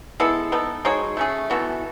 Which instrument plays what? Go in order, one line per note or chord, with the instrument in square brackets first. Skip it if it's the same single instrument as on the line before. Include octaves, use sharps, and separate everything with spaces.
[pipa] G#3 B3 E4 A4
B3 D#4 A4
G#3 D#4 F#4 C#5
A3 C#4 G#4
E3 B3 F#4 A4